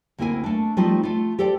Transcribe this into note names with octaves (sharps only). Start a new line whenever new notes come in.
D2 A#3 C4 E4 A#4 G#5
A3 D4
F3 G3 A3 C4 D#4 F4
A3 F4
G4 A4 C5 D5 G5